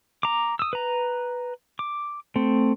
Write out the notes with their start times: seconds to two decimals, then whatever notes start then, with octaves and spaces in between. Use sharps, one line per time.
0.23 A#5 D6
0.59 D#6 E6
0.73 B4 A#5
1.79 D6
2.36 A3 C4